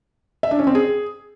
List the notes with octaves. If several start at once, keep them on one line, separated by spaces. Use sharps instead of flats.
E5
D4
C#4
C4
G#4